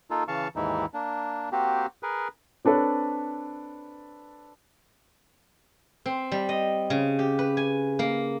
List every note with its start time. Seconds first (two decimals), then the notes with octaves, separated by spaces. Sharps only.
0.11 A#3 D#4 F4 A4
0.28 C#3 E3 F5 A5 C#6
0.56 D#2 G#2 E3 D#4 E4
0.94 A#3 D4
1.52 A#3 C4 F#4 G4
2.03 G#4 A#4 B4
2.65 C4 D4 A4 B4 C#5
6.06 C4
6.32 G3
6.49 D#5
6.90 C#3
7.19 G4
7.39 B4
7.57 G#5
7.99 A#3